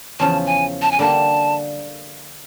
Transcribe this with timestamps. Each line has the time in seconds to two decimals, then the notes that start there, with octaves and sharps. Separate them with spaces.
0.19 E2 C#3 F3 A5
0.46 G#5
0.82 A5
0.91 G#5
0.99 D3 G3 A#3 A5